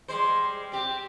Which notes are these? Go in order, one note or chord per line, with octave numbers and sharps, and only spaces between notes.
G3 G#3 C5
C4 G4